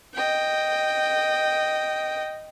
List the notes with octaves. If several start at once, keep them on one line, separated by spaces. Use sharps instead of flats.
D#5 G5